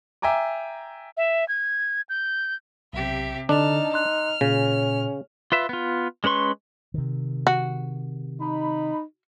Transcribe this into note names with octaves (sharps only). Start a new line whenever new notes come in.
E5 G5 G#5 A#5 D6
E5
G#6
G6
B1 C3 G4 E5
D3 D4 D#4 A5 F6
C6 F6 F#6
A#2 C#3 C#4
F4 B4 E5
B3 F4
G#3 C#4 B4 C6 C#6
C3 D#3
F#4
D#4 B5